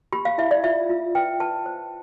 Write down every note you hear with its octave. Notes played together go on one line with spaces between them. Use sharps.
G4 B5
F5
E4 E5
D5
F4 E5
F4
B4 G5
B4 A5
C5